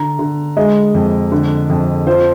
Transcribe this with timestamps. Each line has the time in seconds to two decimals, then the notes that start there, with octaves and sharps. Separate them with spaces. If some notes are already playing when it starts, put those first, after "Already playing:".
Already playing: D3 A#5
0.19 D3
0.57 G#3 D#5
0.94 F2
1.32 D3
1.70 F2
2.07 F3 C5